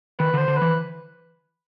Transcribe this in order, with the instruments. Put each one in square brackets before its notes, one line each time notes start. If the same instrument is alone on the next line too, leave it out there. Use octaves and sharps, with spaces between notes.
[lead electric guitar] D#3 [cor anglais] B4
[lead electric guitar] D3 [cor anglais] C5
[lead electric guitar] D3
[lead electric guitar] E3 [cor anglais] B4